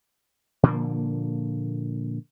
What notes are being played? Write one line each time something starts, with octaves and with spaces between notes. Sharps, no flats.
A#2 D3 F3 A#3